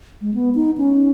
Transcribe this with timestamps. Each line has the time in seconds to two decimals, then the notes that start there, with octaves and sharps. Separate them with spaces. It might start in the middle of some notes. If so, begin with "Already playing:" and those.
0.21 G#3
0.34 B3
0.55 D#4
0.78 C#4